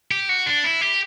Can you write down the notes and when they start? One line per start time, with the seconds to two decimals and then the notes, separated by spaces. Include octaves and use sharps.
0.11 G4
0.29 F#4
0.46 D4
0.64 E4
0.81 G4